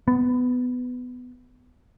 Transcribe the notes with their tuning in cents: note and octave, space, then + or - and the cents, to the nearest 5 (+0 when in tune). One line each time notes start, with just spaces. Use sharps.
B3 +15